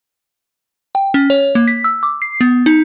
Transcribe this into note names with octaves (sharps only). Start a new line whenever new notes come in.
G5
C#4
C#5
A#3
B6
E6
D6
C7
B3
D#4